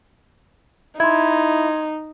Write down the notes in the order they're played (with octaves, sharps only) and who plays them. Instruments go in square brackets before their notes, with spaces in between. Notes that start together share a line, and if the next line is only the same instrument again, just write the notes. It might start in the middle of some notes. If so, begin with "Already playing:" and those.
[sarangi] D#4 [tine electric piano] E4 [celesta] C6 G#6